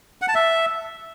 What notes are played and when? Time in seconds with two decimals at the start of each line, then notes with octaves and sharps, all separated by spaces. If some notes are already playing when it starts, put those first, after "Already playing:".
0.22 F#5
0.28 A5
0.35 E5